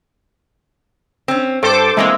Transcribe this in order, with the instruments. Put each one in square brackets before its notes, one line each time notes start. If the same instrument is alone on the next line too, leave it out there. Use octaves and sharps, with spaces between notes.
[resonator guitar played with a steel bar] C4 C#4
[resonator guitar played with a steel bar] G2 [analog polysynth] A4 C5 D6
[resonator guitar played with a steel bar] E3 A#3 C4 [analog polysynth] G#3